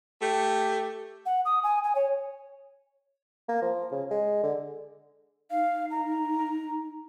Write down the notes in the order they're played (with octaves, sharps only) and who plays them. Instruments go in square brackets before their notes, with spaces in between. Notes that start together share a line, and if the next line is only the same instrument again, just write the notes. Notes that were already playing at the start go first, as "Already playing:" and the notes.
[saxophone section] A3 G4
[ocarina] F#5
D#6
G#5
G#5
C#5
[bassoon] A#3
F3
C#3
G#3
D3
[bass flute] D#4 [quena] F5
[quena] A#5